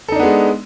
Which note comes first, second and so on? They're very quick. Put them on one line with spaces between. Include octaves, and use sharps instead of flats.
A4 D#4 D4 B3 G#3